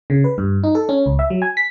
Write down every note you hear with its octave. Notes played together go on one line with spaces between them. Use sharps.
C#3
B4
G2
D#4
A4
C#4
C#2
E5
F#3
G#5
B6